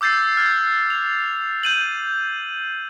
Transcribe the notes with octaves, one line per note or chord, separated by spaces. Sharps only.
D6 E6 G6 A6 C7
F6 G#6
F7
G6 D#7 F#7